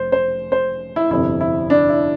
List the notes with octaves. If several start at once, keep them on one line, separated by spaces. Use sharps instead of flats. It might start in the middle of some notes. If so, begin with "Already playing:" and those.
Already playing: F1 C5
C5
C5
E4
G1 F2 C3 E4
E4
D4
E4